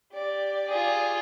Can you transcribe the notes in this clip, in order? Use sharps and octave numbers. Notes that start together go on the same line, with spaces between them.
G4 D5
F4 G#4